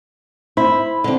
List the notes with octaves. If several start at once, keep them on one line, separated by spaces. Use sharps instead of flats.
E4 C5 B5
D3 C4